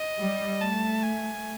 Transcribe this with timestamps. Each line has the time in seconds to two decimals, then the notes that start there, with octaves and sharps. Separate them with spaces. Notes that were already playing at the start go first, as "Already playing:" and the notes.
Already playing: D#5
0.20 G3
0.61 A3 A5
1.03 G#5